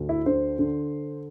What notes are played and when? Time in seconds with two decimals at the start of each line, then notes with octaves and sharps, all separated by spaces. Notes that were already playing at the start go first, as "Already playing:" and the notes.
Already playing: D2
0.09 E4
0.26 D3 C5
0.59 D3